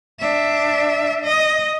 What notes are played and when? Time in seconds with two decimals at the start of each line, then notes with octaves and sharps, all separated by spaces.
0.20 D4 E5
1.24 D#5